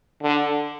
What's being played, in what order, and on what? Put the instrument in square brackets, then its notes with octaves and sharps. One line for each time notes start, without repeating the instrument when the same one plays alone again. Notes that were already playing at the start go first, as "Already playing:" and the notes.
[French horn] D3